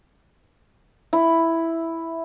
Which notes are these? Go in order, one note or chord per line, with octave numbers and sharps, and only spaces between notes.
E4